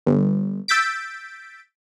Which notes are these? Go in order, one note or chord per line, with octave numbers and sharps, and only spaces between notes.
G1
E6 G6 A6 B6 D7